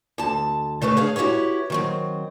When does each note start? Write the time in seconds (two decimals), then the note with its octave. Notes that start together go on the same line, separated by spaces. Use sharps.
0.18 D2 A5
0.81 C#3 A3 B4 F5
0.97 G#4 C#5 F5
1.16 E4 F#4 G4 B4 C#5
1.70 D#3 F#3 C4